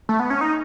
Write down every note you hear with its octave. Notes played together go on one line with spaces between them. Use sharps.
A3
B3
C#4
D#4